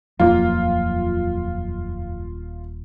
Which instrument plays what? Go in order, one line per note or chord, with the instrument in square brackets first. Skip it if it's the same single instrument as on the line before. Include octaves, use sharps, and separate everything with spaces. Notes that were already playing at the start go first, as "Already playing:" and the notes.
[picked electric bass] D#1 A#3 [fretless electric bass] F2 F#3 [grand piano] F4